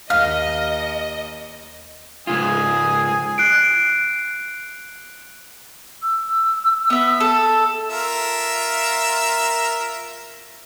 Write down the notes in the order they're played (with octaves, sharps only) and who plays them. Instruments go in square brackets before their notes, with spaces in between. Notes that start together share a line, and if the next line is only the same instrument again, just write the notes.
[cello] D#2 [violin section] D#5 [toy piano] F5 [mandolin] F6
[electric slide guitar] G#2 C#3 F4 [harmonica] G#5 D#6
[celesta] F#6 C7 D7
[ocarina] E6
[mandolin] B3 E5
A4
[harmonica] F4 A#4 E5